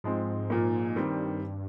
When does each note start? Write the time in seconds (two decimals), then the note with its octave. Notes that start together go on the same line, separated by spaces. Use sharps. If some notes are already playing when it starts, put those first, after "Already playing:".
0.04 G#2 F3 G#3 C4
0.50 A#2 F3 A#3
0.96 G2 D#3 G3 C4